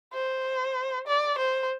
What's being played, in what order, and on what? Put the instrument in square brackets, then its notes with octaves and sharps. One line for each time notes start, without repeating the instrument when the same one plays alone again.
[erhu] C5
D5
C5